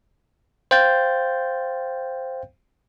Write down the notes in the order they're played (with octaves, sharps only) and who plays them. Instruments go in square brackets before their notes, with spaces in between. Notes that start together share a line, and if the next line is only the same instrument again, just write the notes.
[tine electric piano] C5 F5 G5 G6 A6